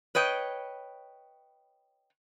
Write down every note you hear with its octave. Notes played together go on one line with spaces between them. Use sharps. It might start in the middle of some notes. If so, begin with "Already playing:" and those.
B4 C#5 D#5 G5